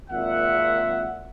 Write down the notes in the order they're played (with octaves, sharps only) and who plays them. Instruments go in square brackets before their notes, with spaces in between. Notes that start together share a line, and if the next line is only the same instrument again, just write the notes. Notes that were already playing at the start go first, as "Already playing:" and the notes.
[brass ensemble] G#1 A#2 E5 F#5